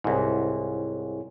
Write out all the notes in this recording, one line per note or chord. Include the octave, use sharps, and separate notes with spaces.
C2 G#2 E4 G#4 C#5